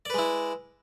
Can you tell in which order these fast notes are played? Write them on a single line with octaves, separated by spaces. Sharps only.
D5 B4 G#3 E4